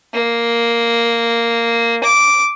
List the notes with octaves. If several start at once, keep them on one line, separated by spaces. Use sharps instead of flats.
A#3
D6